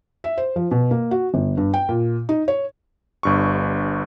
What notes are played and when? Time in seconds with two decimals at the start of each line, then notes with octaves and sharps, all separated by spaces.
0.24 E5
0.37 C5
0.56 F3
0.71 B2
0.91 A#3
1.11 F#4
1.34 G1
1.57 G2
1.74 G5
1.89 A#2
2.29 D#4
2.48 C#5
3.23 G1 G2 C#6